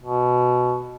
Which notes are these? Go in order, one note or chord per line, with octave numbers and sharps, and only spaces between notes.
B2